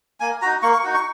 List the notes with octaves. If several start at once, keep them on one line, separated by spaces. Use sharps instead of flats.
A#3 G#5
D#4 F#4 A#5
A#3 C#6
C#6
D#4 F#4
C#6